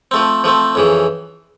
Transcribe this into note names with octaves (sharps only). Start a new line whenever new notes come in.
F3 A3 C4
F3 A3 C4
F2 C#3 E3